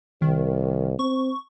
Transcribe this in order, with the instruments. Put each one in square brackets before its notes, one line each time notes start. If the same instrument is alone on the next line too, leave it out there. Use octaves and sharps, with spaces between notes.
[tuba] C2 [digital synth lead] D#3
[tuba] C4 [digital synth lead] C#6